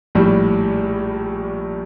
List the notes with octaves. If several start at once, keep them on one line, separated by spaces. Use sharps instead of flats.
A#1 A2 G3